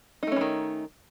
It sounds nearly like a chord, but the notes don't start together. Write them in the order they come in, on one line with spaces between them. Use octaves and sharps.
D#4 A3 C#4 E3 D#3